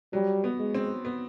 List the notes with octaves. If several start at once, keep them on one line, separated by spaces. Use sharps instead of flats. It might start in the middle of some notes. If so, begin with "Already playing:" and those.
F#3 G3
B3
G#3
C4
B3